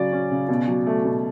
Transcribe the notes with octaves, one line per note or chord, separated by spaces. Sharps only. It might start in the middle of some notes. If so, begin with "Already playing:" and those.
Already playing: C#3 F#3 D5
C#4
C#3
B2
F#3
A3
B2